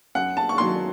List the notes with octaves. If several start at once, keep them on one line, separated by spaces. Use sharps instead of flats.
F#2 F#5
A5
C#6
D#3 F#3 A#3 C6